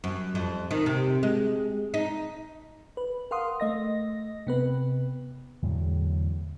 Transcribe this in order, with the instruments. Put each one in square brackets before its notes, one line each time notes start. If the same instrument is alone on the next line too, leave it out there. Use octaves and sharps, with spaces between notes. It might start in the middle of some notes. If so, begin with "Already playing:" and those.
[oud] F#2
F2
D#3
C3
G#3
D#4
[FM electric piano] B4
A#4 F5 F#5 C6 D#6
A3 D#5 A#6
C3 B3 B4
[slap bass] E2 A2 D3 F#3